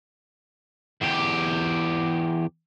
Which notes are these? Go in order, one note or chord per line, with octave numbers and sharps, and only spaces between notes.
E2 G4